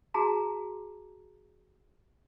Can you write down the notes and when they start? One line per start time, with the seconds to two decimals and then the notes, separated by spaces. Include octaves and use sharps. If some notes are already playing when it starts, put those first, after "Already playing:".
0.14 F#4 G#4 A5 A#5